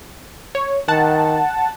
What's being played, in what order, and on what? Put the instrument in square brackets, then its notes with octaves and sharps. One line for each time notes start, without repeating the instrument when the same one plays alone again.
[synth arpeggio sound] C#5
[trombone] D#3 [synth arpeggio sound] F#5 A5